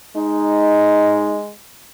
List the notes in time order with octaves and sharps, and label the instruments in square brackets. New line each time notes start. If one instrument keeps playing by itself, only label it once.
[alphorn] G#3 [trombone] D#4